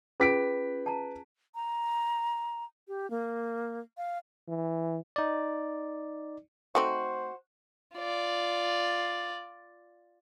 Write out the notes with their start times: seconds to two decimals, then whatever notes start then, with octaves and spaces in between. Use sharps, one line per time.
0.20 C#4 F4 G#4 B4 B6 D7
0.86 A5 A#5
1.55 A#5
2.88 G4
3.10 A#3
3.97 F5
4.48 E3
5.16 D#4 D5
6.75 A3 C4 D#4 F#4 C5
7.95 F4 D5